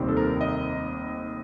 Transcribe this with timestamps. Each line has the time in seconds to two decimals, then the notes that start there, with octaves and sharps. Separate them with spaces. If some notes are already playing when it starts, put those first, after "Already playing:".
Already playing: F1 D#2 D#3 G3 C4
0.08 A4
0.17 A#4
0.41 D#5